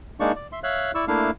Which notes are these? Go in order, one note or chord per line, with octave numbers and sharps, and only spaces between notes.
G#3 A#3 D4 D#4 D5 C#6
D5
E5 C6
C#5 E5 F5 F#6
E4 D5 C#6 E6
A3 A#3 D4 E4 F5